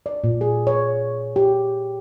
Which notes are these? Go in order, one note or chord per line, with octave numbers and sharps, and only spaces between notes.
D5
A#2
G#4
C#5
G4